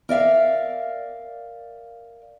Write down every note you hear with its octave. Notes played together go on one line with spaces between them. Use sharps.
A#4 D5 E5 F5